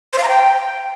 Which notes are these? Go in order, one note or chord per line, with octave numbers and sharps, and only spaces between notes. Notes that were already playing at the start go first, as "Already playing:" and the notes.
C5
F5
A#5
G5